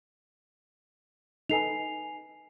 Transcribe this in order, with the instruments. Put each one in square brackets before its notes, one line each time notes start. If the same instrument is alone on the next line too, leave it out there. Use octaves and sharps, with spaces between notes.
[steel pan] D#4 A4 B4 [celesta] G#5 C7 F7